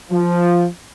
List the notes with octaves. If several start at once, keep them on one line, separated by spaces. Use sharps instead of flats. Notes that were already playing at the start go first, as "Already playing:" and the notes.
F3